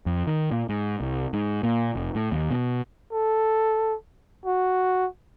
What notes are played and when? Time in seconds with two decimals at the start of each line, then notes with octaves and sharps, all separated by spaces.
0.06 F2
0.27 D#3
0.51 A#2
0.69 G#2
1.01 C2
1.33 G#2
1.63 A#2
1.96 F1
2.15 A2
2.32 D#2
2.51 B2
3.12 A4
4.46 F#4